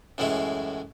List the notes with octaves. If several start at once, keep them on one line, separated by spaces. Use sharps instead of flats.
F#2 A2 E3 G#3 E4